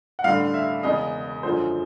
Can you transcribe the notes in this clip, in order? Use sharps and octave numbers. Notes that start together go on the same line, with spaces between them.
F#5
A1 G2 D3 F5
E5
E1 E2 C#3 D#5
F#2 D3 F3 G#3 C5